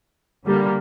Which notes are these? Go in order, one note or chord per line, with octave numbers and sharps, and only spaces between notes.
D3 G3 A#3